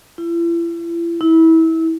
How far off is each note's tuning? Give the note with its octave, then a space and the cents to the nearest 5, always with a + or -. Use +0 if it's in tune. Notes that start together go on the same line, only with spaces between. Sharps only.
E4 +40
E4 -25